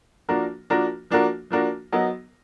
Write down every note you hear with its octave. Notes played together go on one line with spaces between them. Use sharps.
F3 A#3 D4 F#4 A#4
F3 A#3 D4 F#4 A#4
F3 A#3 D4 F#4 A#4
F3 A#3 D4 F#4 A#4
F#3 B3 D#4 A#4